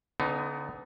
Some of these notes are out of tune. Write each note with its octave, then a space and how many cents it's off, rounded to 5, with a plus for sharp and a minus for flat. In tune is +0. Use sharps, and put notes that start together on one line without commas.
D3 -35 B3 +30 D#4 +0